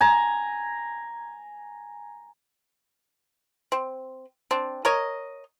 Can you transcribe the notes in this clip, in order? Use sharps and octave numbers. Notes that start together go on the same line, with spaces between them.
G#5 A#5
C4
C4 D4
A#4 C#5 D#5